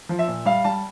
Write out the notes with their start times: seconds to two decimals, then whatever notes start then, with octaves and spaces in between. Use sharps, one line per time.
0.09 F3
0.19 E5
0.27 A#2
0.45 G3 F5
0.64 G3 A5